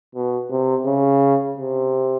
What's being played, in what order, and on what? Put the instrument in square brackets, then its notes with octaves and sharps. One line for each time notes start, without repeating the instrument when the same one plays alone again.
[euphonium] B2
C3
C#3
C3